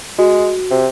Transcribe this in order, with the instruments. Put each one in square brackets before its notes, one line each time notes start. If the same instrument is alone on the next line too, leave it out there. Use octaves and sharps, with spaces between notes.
[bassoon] G#3 [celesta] F#4
[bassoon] C3